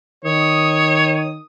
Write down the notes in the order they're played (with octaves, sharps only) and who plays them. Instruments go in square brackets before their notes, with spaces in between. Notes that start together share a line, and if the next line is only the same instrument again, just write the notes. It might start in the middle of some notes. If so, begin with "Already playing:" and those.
[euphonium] D#3 [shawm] C#5 [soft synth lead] D#6